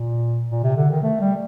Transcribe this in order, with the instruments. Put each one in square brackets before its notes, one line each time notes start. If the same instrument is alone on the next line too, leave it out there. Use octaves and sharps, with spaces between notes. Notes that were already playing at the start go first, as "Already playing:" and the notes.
Already playing: [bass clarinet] A#2
A#2
C3
D3
D#3
A3
G3